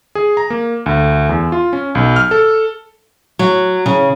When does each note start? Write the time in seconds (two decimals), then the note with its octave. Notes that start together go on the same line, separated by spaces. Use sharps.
0.15 G#4
0.37 A#5
0.50 A#3
0.86 D2
1.29 E2
1.52 F4
1.73 C#4
1.95 B1
2.16 F6
2.31 A4
3.39 F#3
3.86 C#3